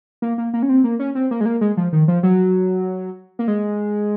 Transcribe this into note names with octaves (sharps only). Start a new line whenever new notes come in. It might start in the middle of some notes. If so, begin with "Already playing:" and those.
A#3
A#3
A#3
C#4
C4
A#3
C#4
C4
A#3
G#3
A#3
G#3
F3
D#3
F3
F#3
A#3
G#3